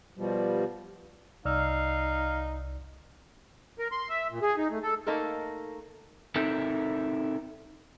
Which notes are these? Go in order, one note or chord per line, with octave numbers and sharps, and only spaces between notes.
B2 F3 G3
C2 D#4 D5 F5 E6 F6
A#4
C6
E5
A#2
G#4
D#4
A3
A4
A3 A#3 D#4 A4 A#4
C4 D#4 E4 A4 A#4